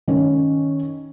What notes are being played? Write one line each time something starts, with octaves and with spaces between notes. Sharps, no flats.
D#3 C#4